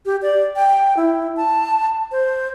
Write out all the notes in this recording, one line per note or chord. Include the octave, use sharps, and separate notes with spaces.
G4
D5
G5
E4
A5
C5